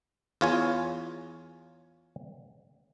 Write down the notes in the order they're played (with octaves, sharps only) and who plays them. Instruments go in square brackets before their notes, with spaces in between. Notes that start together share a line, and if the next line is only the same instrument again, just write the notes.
[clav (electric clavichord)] E2 F4 C#5 G#5